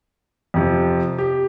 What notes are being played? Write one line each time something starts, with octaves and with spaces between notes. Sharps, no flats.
F2 C3 F3
G4